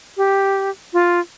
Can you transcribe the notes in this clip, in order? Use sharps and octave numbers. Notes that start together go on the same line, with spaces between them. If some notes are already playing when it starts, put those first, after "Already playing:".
G4
F4